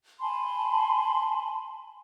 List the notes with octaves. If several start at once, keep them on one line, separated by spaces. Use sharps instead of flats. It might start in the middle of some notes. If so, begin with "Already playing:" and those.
G#5 A5 B5 C6